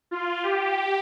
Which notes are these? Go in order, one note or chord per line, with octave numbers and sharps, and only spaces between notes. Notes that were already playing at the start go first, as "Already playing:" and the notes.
F4
G4